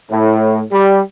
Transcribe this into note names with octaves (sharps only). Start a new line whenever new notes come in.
A2
G3